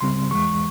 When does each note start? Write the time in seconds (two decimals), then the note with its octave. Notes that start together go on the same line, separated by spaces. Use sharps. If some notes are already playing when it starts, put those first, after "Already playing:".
0.01 C#2 C#3 G3 C4 C6
0.31 E2 E3 G#3 C#6